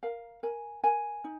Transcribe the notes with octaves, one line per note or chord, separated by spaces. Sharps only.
A#4 F5
A#4 G#5
A#4 G#5
D#4